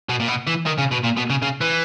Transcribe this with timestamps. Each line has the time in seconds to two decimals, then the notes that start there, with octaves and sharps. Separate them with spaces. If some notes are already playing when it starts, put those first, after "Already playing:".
0.09 B2
0.20 A#2
0.28 B2
0.47 E3
0.67 D#3
0.79 C#3
0.92 B2
1.04 A#2
1.17 B2
1.30 C#3
1.42 C#3
1.61 E3